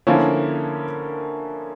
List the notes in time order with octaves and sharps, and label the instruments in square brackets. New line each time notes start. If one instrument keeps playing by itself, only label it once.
[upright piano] D3 F3 A#3 C#4 E4